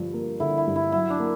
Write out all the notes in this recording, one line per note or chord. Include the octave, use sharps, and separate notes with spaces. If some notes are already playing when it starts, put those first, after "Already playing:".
Already playing: G2 D3 F3
A#3
D3 E4
E4
G2
E4
F#3 E4
D4
A#3